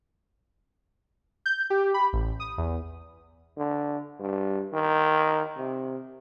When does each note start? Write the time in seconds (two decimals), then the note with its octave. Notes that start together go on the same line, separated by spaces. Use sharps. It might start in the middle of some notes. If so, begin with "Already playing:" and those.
1.46 G6
1.70 G4
1.94 B5
2.13 A1
2.40 D#6
2.58 E2
3.57 D3
4.20 G2
4.73 D#3
5.57 C3